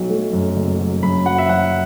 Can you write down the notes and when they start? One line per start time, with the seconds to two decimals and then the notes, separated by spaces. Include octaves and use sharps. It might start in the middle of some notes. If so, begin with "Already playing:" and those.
Already playing: B1 F#3
0.10 A3
0.33 F#2
0.56 F#1
0.79 F#3
1.03 F#2 B5
1.26 F#3 F#5
1.38 E5
1.49 F#2 F#5